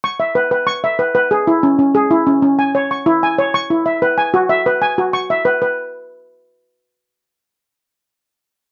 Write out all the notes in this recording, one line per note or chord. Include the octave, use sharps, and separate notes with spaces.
C#6
E5
B4
B4
C#6
E5
B4
B4
G#4
E4
C#4
C#4
G#4
E4
C#4
C#4
G#5
C#5
C#6
E4
G#5
C#5
C#6
E4
E5
B4
G#5
F#4
E5
B4
G#5
F#4
C#6
E5
B4
B4